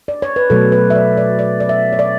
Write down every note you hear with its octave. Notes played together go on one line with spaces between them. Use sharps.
D5
C#5
B4
B2 F#3 A3 A4
B4
E5
D5
D5
D5
D5
E5
C#5
D5